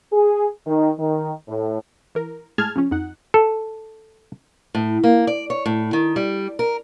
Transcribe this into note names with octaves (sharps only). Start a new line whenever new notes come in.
G#4
D#3
D#3
A2
E3 A#4
A2 G#3 G#4 A5 F6 G#6
C#3 F3 C#4
F2 D#4 F#5
A4
A2
A#3
D5
C#5
A2
D#3
G3
A#4